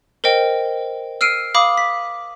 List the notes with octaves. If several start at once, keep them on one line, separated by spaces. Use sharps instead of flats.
A#4 C5 D#5 G5
E6 F6 C7 D7 D#7
F5 B5 D6 D#6
B6